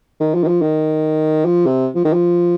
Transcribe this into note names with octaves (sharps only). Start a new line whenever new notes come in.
D#3
F3
D#3
F3
D#3
F3
C3
F3
D#3
F3